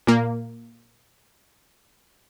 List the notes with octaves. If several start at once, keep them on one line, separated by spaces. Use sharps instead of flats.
A#2 A#3